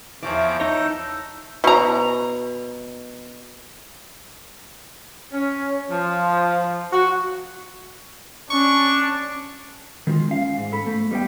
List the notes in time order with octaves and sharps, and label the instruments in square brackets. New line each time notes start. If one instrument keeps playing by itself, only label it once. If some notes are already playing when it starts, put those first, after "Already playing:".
[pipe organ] E2 F3 D6 [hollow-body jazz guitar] E3 E4 [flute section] C#5 C#6
[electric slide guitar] D#4 C#5 [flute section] A5 E6 G6 [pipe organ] A#6
[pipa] B2 A#5
[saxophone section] C#4
F3
F#4
[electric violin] C#4 [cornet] D4 [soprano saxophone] C#6
[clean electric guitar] D#3 G#3 F4
C#4 F5
G#2
A4 B5
A3
G3 B3 E4 G5